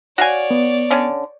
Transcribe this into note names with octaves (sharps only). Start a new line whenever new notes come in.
F#4 C#5 D5 F5 G#5
B3
D3 C#4